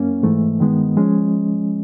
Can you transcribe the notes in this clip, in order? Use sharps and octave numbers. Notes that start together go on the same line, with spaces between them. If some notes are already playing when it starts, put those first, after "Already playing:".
Already playing: F#2 A#3 C#4
G#2 E3 A3
G2 D#3 G#3 B3
F3 G#3 C#4